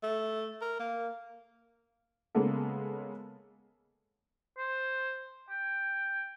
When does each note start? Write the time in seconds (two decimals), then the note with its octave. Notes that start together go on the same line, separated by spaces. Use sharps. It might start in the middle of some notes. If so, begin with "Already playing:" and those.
0.03 A3
0.62 A#4
0.79 A#3
2.35 C#3 G#3 A#3 B3 A4
4.58 C5
5.50 G5